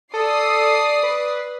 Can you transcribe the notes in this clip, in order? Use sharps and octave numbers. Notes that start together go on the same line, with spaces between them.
A4 D5 D#6 C7
B4